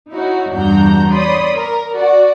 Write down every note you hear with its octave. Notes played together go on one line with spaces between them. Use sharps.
D#4 E4 F#4 C#5
E2 G2 D4 F#4 A#5 G6
C#5 D5 B5 C6 D#6
A#4
F#4 D5